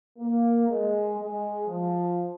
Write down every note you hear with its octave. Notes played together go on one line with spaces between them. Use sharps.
A#3
G#3
G#3
F3